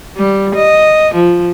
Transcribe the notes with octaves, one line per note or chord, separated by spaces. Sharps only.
G3
D#5
F3